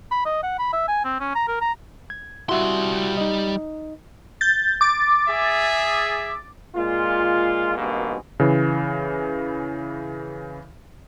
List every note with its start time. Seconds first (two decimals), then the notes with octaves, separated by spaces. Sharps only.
0.11 B5
0.25 D#5
0.43 F#5
0.59 B5
0.73 E5
0.88 G#5
1.04 C4
1.20 C#4
1.35 A#5
1.48 A#4
1.61 A#5
2.10 G#6
2.49 G3 E4 F#4 E5 C6
3.17 D#4 D#5
4.41 G6 A6
4.81 D6 A6
5.29 G#4 E5
6.75 A#2 G#3 F4
7.77 G#1 G2 B2 G#3 A#3
8.40 C#3 E3